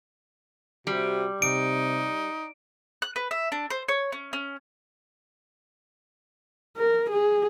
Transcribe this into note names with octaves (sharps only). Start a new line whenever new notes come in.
C3 G3 F#4
C3 D#4 D7
F#6
B4
E5
D4
C5
C#5
C#4
C#4
A#4
G#4